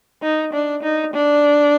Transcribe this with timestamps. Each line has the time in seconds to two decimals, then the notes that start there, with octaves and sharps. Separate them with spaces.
0.23 D#4
0.53 D4
0.83 D#4
1.13 D4